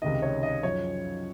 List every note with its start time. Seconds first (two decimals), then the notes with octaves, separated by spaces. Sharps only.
0.02 C#2 C3 D#3 D#5
0.22 C#5
0.43 D#5
0.63 F#2 F3 C#5